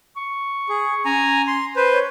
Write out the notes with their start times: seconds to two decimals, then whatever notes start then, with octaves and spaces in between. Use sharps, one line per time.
0.16 C#6
0.69 G#4
1.05 C#4 G#5 A#5
1.47 C6
1.76 B4 C5
1.93 C#5